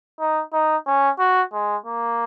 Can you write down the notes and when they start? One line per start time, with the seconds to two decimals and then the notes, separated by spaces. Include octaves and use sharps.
0.20 D#4
0.53 D#4
0.87 C#4
1.19 F#4
1.53 G#3
1.86 A#3